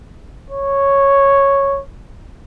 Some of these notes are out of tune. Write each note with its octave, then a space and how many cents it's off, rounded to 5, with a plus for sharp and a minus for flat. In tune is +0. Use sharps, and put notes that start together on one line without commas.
C#5 -5